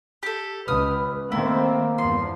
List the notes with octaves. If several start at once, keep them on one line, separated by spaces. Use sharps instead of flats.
G4 A4
C#2 B4 D#6 F6
D#3 A3 A#3 C4 E4
E2 G2 F3 C6